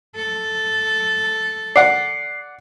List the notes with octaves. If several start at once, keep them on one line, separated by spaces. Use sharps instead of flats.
A4
D5 F#5 C7